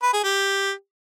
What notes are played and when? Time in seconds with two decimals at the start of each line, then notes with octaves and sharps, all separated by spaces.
0.03 B4
0.13 G#4
0.23 G4